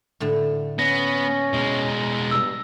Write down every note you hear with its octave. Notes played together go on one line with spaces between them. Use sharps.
A2 D3 A3
B3 C#4 A#6
B2 G#3
G2 E6